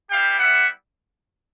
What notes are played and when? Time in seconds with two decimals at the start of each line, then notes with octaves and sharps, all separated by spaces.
0.11 G3 B3 E4 G4 F5 G5
0.39 E5 F#5